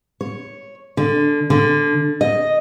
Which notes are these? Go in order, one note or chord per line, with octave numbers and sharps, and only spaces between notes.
C#5
D3
D3
D#5